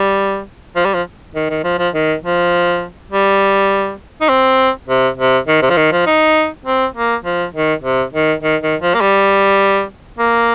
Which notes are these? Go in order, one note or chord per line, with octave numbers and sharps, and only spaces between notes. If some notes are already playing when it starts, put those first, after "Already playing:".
Already playing: G3
F3
G3
F3
D#3
D#3
F3
F3
D#3
F3
G3
D#4
C4
C3
C3
D#3
C3
F3
D#3
F3
D#4
C4
A#3
F3
D#3
C3
D#3
D#3
D#3
F3
A#3
G3
A#3